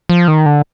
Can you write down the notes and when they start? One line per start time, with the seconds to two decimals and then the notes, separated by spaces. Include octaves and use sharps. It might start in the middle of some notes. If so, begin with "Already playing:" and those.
0.09 F3
0.28 D#3
0.46 D3